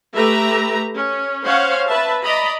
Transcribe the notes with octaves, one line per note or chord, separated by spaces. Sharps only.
A3 G4 B4 E5 A#5
C#4
C#4 C5 C#5 F5 F#5
B4 E5 A5
D5 D#5 A#5 B5